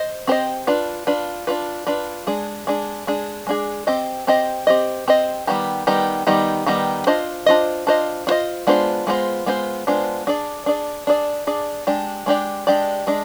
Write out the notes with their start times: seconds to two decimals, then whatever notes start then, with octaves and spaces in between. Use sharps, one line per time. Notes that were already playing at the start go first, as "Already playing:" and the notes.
Already playing: C5 D#5
0.27 C4 G4 C5 D#5
0.67 D4 F4 B4
1.07 D4 F4 B4
1.47 D4 F4 B4
1.87 D4 F4 B4
2.27 G#3 D4 G#4
2.67 G#3 D4 G#4
3.07 G#3 D4 G#4
3.47 G#3 D4 G#4
3.87 C4 G4 C5 D#5
4.27 C4 G4 C5 D#5
4.67 C4 G4 C5 D#5
5.08 C4 G4 C5 D#5
5.47 D#3 G3 B3 D#4 G4
5.87 D#3 G3 B3 D#4 G4
6.27 D#3 G3 B3 D#4 G4
6.66 D#3 G3 B3 D#4 G4
7.07 D4 F4 C5 D#5
7.46 D4 F4 C5 D#5
7.87 D4 F4 C5 D#5
8.27 D4 F4 C5 D#5
8.67 G#3 B3 D4 F4 C5
9.07 G#3 B3 D4 F4 C5
9.46 G#3 B3 D4 F4 C5
9.87 G#3 B3 D4 F4 C5
10.27 D4 G#4 D5
10.66 D4 G#4 D5
11.07 D4 G#4 D5
11.47 D4 G#4 D5
11.87 G#3 D4 G4 D5
12.26 G#3 D4 G4 D5
12.67 G#3 D4 G4 D5
13.07 G#3 D4